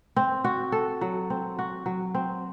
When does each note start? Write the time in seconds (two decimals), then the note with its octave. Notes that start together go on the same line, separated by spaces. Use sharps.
0.16 C4
0.44 F#4
0.72 A4
1.01 F#3
1.30 C4
1.59 F#4
1.86 F#3
2.15 C4